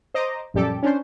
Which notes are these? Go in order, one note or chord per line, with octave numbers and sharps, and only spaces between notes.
C5 D#5 A#5 D6
A#1 F#2 G3 G4 A4 D6
C#4 D4 C5